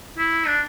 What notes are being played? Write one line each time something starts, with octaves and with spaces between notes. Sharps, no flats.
E4
D4